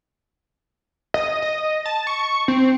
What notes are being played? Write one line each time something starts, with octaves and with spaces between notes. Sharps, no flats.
D#5
D#5
A5
C#6
C4